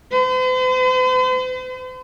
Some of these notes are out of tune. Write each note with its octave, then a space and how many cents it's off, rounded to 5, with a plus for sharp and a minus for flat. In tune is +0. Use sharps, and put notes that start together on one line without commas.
C5 -45